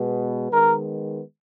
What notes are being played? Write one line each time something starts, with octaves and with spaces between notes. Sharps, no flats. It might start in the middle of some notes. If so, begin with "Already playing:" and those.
Already playing: B2 G#3 B3
D#3 G#3 B3 A#4